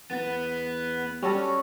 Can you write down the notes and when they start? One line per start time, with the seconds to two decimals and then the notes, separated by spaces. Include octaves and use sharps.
0.11 E2 B3
1.22 G3 C#4 F#4 A4